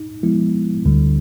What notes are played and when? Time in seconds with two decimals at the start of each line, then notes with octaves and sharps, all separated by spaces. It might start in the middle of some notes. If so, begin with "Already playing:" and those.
Already playing: D#4
0.23 F3 G#3 B3 E4
0.85 D2 D3 G3